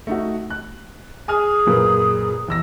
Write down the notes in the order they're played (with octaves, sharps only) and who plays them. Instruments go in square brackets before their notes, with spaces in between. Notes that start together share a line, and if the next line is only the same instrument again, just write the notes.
[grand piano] A3 D#4 F#4
F#6
[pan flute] G#4 [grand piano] G#5 D#6 F6
[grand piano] F#2 A#2 B4
E2 E6 A#6